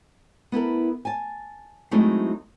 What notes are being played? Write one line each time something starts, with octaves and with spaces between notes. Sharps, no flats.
B3 E4 A4 A#4
G#5 A5
F#3 G#3 A3 C4 D#4 E4